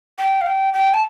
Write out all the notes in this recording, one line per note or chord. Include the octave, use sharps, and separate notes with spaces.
G5
F5
G5
G5
A5